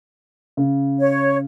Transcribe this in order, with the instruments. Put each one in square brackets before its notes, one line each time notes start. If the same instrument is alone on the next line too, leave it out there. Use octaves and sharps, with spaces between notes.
[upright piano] C#3
[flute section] C#5